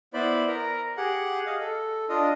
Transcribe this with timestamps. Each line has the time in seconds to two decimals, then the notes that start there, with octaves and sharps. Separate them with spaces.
0.14 B3 E4 C5 D5 B5
0.48 A#4 A#5
0.97 G4 G#4 F#5
1.46 D#5 F5
1.60 A4
2.09 D4 F4 D#5